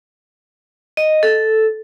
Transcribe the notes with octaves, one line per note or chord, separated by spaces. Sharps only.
D#5
A4